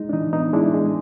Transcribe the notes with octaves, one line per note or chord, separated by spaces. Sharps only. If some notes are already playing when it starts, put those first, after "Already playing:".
Already playing: G#3 D#4
D4
E3 D#4
B3 D#4
G#3 D4 E4
G#3